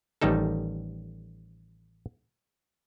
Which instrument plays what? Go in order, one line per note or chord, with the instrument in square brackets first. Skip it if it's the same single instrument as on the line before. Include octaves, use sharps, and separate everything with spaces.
[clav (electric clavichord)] A1 D#3 G3 D#4 A4